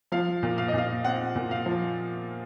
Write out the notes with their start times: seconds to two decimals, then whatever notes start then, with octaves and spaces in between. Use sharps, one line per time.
0.12 F3 F5
0.43 A#2
0.58 F5
0.68 D#5
0.73 A#2 F5
1.04 C4 F#5
1.35 A#2
1.51 F5
1.66 F3